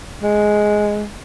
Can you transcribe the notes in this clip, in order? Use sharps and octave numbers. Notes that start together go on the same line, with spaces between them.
G#3